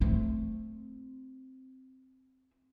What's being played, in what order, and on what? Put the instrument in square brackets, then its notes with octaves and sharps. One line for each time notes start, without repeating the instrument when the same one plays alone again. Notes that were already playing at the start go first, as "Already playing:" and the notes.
[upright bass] A3 C4